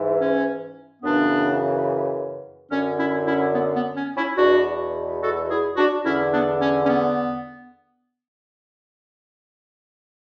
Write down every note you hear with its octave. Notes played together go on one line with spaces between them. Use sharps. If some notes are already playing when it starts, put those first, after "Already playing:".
Already playing: G#2 E3
C#4
F#2 C#3 E3 B3 D4
F#2 D3 C#4
C#4 E4
C#4 E4
B3
B3
C#4
C#4 E4
E2 B2 D4 F#4
F#4 A4
E4 G#4
D4 F#4
E2 D3 C#4 E4
B3 D4
C#4
C#4
B3